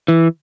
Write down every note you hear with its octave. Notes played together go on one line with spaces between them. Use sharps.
E3